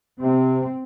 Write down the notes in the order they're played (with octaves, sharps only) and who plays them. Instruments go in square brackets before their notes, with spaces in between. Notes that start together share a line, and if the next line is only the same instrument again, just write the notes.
[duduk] C3 [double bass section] C4